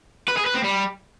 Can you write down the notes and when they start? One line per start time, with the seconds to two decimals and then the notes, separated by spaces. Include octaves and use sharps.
0.29 B4
0.37 G#4
0.46 B4
0.55 C4
0.64 G3